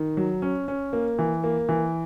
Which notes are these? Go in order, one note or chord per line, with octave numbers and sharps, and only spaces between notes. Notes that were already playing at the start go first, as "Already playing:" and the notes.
Already playing: D#3
F#3
C#4
C#4
A#3
E3
A#3
E3